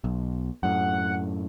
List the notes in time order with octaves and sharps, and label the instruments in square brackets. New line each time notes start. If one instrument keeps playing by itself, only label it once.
[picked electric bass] B1
[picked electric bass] F#2 A2 [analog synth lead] F#5